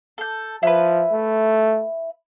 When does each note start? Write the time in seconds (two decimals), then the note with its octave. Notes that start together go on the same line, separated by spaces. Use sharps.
0.18 A4 G6
0.63 F3 E4 B4
1.12 A3